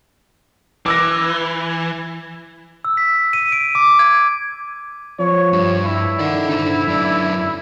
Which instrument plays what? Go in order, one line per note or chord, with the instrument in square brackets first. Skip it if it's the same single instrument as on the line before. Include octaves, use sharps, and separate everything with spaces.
[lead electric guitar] E3 [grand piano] D6 E6 A#6
[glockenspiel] E6
B6
D#7
D7
D6
G#6
[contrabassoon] F3 [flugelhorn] C#5
[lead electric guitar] G2
[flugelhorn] E4
[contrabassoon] D#3 [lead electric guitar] D5 F#5
[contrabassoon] D3 [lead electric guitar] D#4 C5
[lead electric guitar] F#2 D5